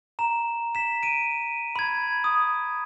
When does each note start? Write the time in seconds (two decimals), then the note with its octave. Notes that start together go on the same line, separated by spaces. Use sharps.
0.19 A#5 E7
0.75 B6 E7
1.03 D7 D#7
1.76 B5 G#6
2.24 D#6